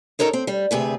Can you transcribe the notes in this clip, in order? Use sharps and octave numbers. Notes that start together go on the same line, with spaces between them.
D#4 A4 A#4 C#5 D#5
C4
G3
D2 C3 G#4 B4